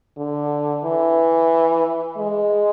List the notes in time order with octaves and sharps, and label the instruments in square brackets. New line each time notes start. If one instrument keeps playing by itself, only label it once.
[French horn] D3
E3
G#3